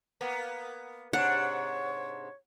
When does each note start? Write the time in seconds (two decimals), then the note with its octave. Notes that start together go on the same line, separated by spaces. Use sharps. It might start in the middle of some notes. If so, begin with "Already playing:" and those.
0.21 A#3 B3
1.13 G#2 C3 D4 C#5 F#5